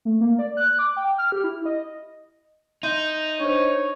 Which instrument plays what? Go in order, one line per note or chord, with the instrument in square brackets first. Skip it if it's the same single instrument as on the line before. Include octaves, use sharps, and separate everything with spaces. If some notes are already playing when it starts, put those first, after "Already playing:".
[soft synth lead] A3
A#3
D5
F#6
D6
G5
F6
G4
E4
D#5
[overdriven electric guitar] D#4 [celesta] E5 C6 G6
[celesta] D4 C5 [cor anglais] C#5